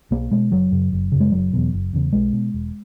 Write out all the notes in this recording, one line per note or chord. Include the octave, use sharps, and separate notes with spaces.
B1 A#3
B2 G#3
F#1 F#3
F#2 C#3
F#1
F#2 C#3
G#3
F#1 F#3
E2 B2
F#1
E2 C#3
B1 G#3
B2
E1